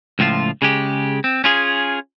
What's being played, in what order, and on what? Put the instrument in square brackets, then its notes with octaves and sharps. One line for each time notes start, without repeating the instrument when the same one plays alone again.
[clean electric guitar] C#2 A2 F3 F4
C#3 G#3 G4
C4
C#4 F4 G#4